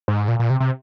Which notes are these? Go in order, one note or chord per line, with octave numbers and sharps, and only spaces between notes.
G#2
A#2
A#2
C3
C3